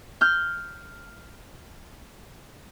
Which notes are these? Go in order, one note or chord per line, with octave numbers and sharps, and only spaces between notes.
F6 G6